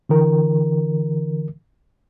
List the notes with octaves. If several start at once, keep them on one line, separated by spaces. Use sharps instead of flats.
D3 E3 A#4